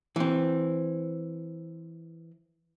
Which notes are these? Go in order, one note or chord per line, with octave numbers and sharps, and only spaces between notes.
E3 C4